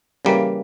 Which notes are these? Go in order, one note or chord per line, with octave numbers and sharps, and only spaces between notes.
C#3 E3 G3 A#3